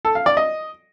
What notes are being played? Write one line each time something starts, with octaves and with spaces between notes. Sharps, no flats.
A4
F5
D5
D#5